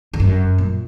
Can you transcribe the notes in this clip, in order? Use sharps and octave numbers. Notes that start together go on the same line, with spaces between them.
E2
F#2
A#2